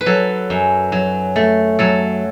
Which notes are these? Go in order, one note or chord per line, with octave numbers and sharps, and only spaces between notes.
B4
F#3 A4
F#2
F#3
A3
F#3 A4